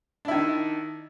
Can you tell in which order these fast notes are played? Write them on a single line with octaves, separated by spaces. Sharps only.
D4 E4 D#3